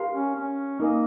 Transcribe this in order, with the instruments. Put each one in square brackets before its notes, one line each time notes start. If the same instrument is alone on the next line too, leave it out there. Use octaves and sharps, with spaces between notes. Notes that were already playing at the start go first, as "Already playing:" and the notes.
Already playing: [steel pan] G4 A#4 F5 C6
[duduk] C#4
C#4
[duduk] A#3 [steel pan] D#4 A#4 D#5